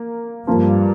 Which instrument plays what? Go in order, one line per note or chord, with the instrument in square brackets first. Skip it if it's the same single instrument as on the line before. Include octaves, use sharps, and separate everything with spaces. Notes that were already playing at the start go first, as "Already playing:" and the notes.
Already playing: [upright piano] A#3
[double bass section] G2 [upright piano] F3 A#3 F4